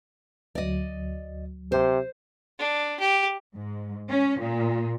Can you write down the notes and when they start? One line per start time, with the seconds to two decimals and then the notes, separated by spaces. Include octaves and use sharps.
0.55 D2 F#3 D5 D#5
1.72 C3 C5
2.59 D4
3.00 G4
3.54 G#2
4.08 C#4
4.41 A#2